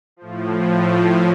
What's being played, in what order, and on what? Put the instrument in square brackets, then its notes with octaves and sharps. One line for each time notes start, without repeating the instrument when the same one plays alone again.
[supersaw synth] A2 F3